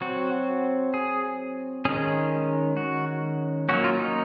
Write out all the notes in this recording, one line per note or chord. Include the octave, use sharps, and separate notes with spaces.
F#3 C4 F#4
G#4
D#3 G#3 C#4 G#4
F#4
F#3 A#3 C#4 F#4
F4
D#4